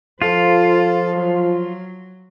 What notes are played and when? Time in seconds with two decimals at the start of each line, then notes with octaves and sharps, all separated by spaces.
0.22 F3 F4 A4 C5
1.16 F#3